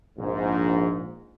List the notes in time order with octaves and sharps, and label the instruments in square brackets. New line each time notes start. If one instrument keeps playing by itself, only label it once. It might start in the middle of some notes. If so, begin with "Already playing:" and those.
[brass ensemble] A#1 G#2